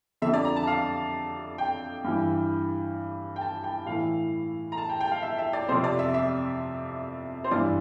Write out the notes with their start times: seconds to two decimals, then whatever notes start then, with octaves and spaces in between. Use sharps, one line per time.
0.22 F2 D3 F3 E5
0.34 D5
0.45 A#5
0.56 A5
0.67 F5
1.58 G5
2.04 G2 E3
3.36 G5
3.41 A5
3.64 G5
3.86 A2 E3 F5
4.72 A#5
4.78 A5
4.89 G5
5.01 G5
5.11 F5
5.23 E5
5.38 E5
5.53 D5
5.68 F2 C3 F3 C5
5.84 D5
5.99 E5
6.14 E5
7.44 C5
7.51 G2 E3 D5